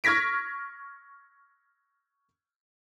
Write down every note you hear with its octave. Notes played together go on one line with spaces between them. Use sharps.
C#6 F6 G#6 A#6 B6 D7